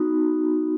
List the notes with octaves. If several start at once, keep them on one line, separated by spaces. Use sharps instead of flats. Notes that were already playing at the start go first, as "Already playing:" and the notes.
Already playing: B3 D#4 F#4